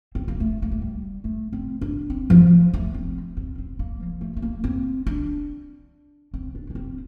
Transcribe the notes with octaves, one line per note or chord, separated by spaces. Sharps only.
C4
A#3
A3
A#3
A3
G3
A3
C4
D4
C4
F3
A3
C4
C4
C4
A#3
F3
A3
A3
A#3
C4
D4
C4
D4
D4
C4